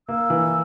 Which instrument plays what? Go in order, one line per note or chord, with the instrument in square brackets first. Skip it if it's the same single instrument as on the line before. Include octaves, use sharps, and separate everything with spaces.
[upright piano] A#3 [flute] E6
[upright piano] E3